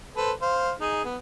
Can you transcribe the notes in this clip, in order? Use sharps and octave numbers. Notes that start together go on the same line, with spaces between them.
A4 B4 C5
C5 F5
D#4 G#4
B3